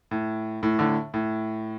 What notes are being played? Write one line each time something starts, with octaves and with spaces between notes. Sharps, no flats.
A2
A2
A2 D3
A2